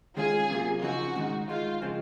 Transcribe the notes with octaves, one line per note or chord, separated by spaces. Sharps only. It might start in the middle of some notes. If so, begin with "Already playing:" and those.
D#3 G#3 C#4 F4 G#4
C3 F#3 A#3 F4
C#3 F3 C4 D#4 F#4
G#2 D#3 G#3 D#4
D#3 G#3 D#4 F4
C#3 F3 G#3 C4